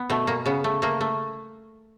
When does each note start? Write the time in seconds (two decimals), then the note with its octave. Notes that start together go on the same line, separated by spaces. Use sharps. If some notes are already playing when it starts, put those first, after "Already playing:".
Already playing: B3
0.10 B2 A3
0.27 B2 A#3
0.46 C#3 B3
0.64 A3
0.82 A3 A#3
1.01 A3